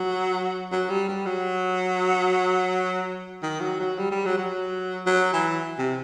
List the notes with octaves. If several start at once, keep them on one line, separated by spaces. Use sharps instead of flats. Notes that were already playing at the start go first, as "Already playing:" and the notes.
Already playing: F#3
F#3
G3
G3
F#3
D#3
F#3
F#3
G3
G3
F#3
F#3
F#3
E3
C3